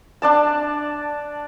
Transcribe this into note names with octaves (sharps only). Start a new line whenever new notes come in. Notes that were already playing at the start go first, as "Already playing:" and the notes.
D4 D5 A5